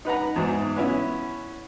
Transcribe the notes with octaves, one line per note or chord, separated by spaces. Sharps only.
D#4 B4 F#5 A#5
E2 G#2 F#3
B3 C#4 E4